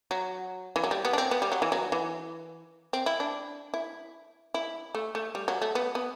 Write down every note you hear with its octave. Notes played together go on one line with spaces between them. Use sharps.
F#3
E3
F#3
G3
B3
D4
C4
B3
G3
F#3
E3
F#3
E3
C4
E4
D4
E4
E4
A3
A3
G3
F#3
A3
B3
B3